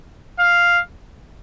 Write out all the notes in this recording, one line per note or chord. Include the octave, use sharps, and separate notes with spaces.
F5